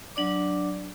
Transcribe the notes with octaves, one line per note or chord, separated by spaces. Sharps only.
F#3 D4 D5 D6